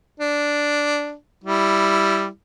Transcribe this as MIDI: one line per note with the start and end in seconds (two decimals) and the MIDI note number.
0.20 1.15 62
1.44 2.27 55
1.44 2.27 64